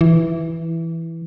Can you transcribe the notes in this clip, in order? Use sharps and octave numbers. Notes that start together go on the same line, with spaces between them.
E3